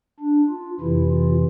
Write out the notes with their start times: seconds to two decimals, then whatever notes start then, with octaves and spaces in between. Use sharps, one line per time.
0.20 D4
0.50 F4
0.80 F2 C3 E3 E4
1.11 F4